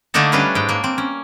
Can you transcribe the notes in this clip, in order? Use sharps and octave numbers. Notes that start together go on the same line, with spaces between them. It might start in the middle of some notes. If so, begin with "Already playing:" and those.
D3 A3 A#3 D4 D#4 A4
G3 C#4 D4 B4 C#5 F5
G#2 G5
A#3
C4
C#4